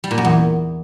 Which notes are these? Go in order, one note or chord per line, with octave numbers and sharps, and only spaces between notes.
G3
A#2
F#2
E2